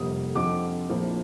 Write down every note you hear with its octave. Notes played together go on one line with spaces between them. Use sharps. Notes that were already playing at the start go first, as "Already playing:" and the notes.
Already playing: F1 F2 D3 G3 A#3 D#6
F2 D3 F3 C4 D#4 D6
A#1 A2 F3 A#3